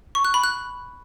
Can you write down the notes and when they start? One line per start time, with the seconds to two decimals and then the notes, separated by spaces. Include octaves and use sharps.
0.15 C#6
0.25 F#6
0.34 B5
0.44 F#6